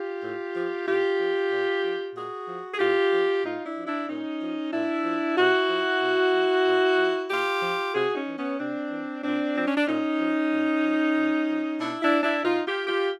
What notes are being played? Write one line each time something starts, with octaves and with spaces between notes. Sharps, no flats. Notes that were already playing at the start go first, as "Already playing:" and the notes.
Already playing: F4 G4
A2
F3
A2 F4 G4
F3
A#2
F3
A#2 F#4 G#4
F3
G#4
A2 F4 G4
F3
A2 D#4 F4
D4 E4
F3
D4 E4
A#2 C#4 D#4
F3
A#2 D4 E4
F3
C3 E4 F#4
F3
C3
F3
A#2
F3
A#2 F4 G4
F3
C3 F#4 G#4
C#4 D#4
E3
B3 C#4
C3 C4 D4
E3
A#2 C4 D4
F3 C4
C#4
D4
A#2 C#4 D#4
F3
A#2
F3
A#2
F3
B2 D4 E4
D4 E4
D4 E4
B2 D#4 F4
F4 G4
F4 G4